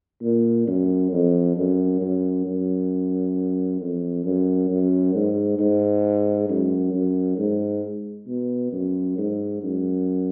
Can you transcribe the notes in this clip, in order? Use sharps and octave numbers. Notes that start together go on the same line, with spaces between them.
A#2
F#2
F2
F#2
F#2
F#2
F2
F#2
F#2
G#2
G#2
F#2
F#2
G#2
B2
F#2
G#2
F#2